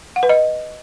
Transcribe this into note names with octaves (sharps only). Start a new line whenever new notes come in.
F#5
B4
D#5